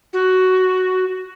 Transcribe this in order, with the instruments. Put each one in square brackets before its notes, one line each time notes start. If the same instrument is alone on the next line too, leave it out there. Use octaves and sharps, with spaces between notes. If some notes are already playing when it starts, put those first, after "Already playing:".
[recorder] F#4